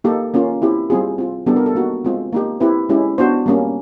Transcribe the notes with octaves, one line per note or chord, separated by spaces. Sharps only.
A#3 D#4 G4 A4
A#3 C#4 F4
C4 E4 G4
G3 C4 F4 G#4
C4 F4
G3 B3 D4 G4 A4
A#4
A4
A#3 D#4 F#4
G#3 C4 F4
A#3 D#4 G4
C4 E4 G4 B4
G#3 C#4 E4 G4
B3 D4 F#4 C5
G3 A#3 C#4